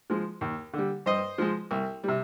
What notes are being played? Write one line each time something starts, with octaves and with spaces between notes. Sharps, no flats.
F3 G#3
D#2
D3 G3
G2 C5 D#5
F3 G#3
C2
C3 G3